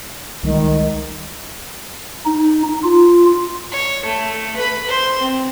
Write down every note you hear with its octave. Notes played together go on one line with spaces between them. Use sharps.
C#2 D#3 G3 G#3
D#4
F4
C#5
A3
B4 B5
C5 C6
C4